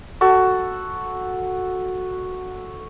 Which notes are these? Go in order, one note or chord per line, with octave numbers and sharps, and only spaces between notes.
F#4 A4